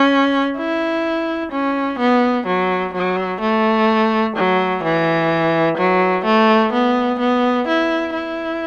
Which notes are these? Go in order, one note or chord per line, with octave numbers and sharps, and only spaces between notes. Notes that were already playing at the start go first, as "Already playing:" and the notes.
Already playing: C#4
E4
C#4
B3
F#3
F#3
A3
F#3
E3
F#3
A3
B3
B3
E4
E4